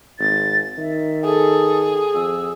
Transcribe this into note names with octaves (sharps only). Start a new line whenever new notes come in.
G#1 A6
D#3 E5
G#4 A4
F2 E6